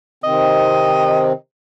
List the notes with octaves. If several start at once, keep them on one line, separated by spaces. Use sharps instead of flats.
C3 D#3 C4 D#5